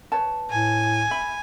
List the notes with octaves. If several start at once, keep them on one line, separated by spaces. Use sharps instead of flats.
B4 C#5 A5
A2 G#5
E5 B5